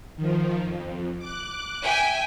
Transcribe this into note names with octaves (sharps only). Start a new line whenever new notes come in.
D#3 F3
F2
D6 F#6
E5 G5 G#5